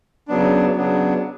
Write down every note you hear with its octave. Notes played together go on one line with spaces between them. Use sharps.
C#3 F#3 B3 D4
C#3 F#3 B3 D4